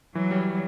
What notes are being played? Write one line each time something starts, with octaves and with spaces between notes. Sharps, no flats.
E3 F#3
G3